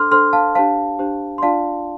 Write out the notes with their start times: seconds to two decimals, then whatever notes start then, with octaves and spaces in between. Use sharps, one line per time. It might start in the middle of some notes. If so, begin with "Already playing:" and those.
Already playing: D4 A4 C5 C6 D6 F6
0.11 D4 A4 C5 C6 F6
0.33 F5 A5
0.55 D4 G4 C5 F5 A5
0.99 D4 G4 C5
1.38 C6
1.42 D4 F4 D5 F5 A5